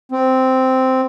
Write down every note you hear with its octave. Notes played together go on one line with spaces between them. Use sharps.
C4